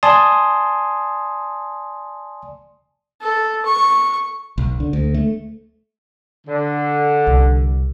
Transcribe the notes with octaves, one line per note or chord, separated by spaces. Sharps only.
D5 G#5 A5 C6 D#6
A4
C#6
B1
D3
D2
A3
D3
C2